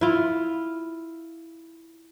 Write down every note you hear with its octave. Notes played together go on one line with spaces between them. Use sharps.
E4 F4